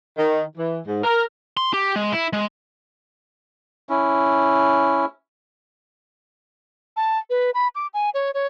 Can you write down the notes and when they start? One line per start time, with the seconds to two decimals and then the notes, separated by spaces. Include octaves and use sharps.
0.18 D#3
0.58 E3
0.86 G#2
1.04 A#4
1.57 C6
1.73 G4
1.96 G#3
2.12 E4
2.33 G#3
3.89 C#4 E4
6.97 A5
7.30 B4
7.54 B5
7.75 D6
7.94 G#5
8.14 C#5
8.34 C#5